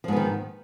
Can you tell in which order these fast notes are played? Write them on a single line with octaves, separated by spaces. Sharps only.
F3 G#2 B3 D#3